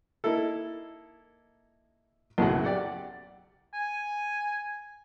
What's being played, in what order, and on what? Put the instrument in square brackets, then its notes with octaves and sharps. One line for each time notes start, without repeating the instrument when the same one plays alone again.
[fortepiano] A#3 D#4 E4 A4
B1 F#2 A2 C#3 F#4 F#5
G4 D5 F#5
[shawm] G#5